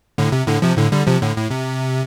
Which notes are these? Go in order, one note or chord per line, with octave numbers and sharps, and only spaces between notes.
A2 D3
C3
A2 D3
C3 F3
A2 D3
D3 G3
C3 F3
A2 D3
A2
C3